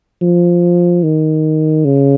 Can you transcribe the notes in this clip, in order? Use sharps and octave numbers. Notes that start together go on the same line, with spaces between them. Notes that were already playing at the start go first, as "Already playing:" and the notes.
F3
D#3
C#3